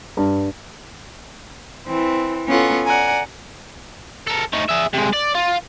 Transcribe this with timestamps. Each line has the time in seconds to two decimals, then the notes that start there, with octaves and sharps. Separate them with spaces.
0.17 G2
1.87 E3 C4
2.47 B3 C#4 F4 A4 F#5 G#5
2.86 D5 F#5 G#5 A#5
4.27 A4 A#4
4.53 A3 D#4
4.69 G#4 E5
4.94 C3 G#3
5.13 D5
5.35 F4